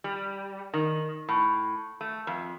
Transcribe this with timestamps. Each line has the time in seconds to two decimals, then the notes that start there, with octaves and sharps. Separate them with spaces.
0.04 G3
0.74 D#3
1.29 A2
2.01 A3
2.27 F2